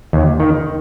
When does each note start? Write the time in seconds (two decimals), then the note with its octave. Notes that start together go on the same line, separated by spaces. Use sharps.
0.13 D#2
0.40 D#3